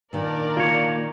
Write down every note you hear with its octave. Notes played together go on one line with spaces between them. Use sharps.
A#2 D#3 D4 A#4 D5
A#3 F4 C#5